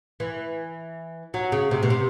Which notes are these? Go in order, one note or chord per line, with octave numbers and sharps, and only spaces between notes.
E3
F#3
C#3
C3
B2
C3